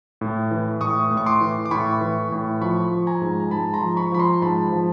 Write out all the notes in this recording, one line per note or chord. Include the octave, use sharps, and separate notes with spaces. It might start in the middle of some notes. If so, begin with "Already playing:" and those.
A2
E3
A2 C#6 D#6
A2
C#6
C6 D6
E3
D6
A2 B5 C#6
E3
A2
F3 B5 C#6
F3
G#5 A#5
G#2
A#5
G#2 A5 B5
A#5 C6
F3
B5 C#6
F3 B5
A#5 C6
G#2 A5 B5
F3